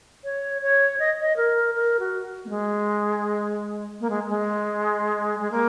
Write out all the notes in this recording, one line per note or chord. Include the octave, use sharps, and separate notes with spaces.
C#5
C#5
D#5
D#5
A#4
A#4
F#4
A#3
G#3
A#3
G#3
G#3
G#3
A#3